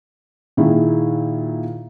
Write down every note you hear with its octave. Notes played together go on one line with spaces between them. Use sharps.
A#2 D#3 E4 G#4